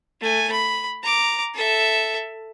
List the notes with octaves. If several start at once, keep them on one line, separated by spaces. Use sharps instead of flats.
A3 G#5
B5
A#5 D6
A4 E5